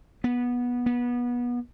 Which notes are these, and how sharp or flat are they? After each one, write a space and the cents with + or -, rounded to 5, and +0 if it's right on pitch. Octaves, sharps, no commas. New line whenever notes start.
B3 -15
B3 -25